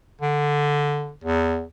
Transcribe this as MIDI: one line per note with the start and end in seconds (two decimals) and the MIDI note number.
0.21 1.11 50
1.24 1.62 40